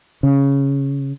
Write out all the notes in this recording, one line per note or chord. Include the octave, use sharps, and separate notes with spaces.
C#3